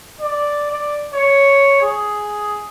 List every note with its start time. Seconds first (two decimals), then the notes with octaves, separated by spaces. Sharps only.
0.21 D5
0.71 D5
1.14 C#5
1.82 G#4